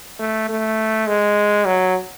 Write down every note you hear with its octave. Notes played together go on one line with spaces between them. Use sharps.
A3
A3
G#3
F#3